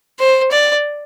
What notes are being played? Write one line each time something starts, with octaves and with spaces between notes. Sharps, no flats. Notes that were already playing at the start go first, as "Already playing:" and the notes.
C5
D5